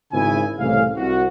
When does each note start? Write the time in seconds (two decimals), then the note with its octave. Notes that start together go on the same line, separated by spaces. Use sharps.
0.12 G#1 C#3 E4 G#5
0.60 C2 A2 C#3 E3 C#4 F5
0.97 C2 F#4